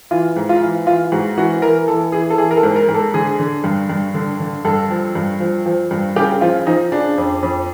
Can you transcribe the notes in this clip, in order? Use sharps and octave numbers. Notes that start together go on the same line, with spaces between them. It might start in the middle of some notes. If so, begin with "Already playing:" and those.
E3 F4
G#2
F4
E3
E3 F4
G#2 F#4
E3 F#4
E3 A#4
E3 A4
E3 G#4
A4
E3 G#4
A#4
A4
G#2
A#4
G#2
A4
D3 G#4
D3
G2
G2
D3
D3
G2 A4
F3
G2
F3
F3
G2
C#3 G4
F3 F4
F3 D#4
C#3 D4
F2
F2